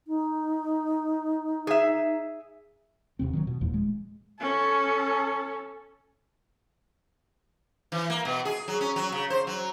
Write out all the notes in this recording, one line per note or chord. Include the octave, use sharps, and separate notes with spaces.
D#4
G#4 E5
E1 C2 C3 C4
D#3 F3 F#3
B2
E1 D#2 A#2 F3
G#3
C#4 A4
E3
A#3
B2
G#4
F#3
C#4
F#3
C#3
C5
F#3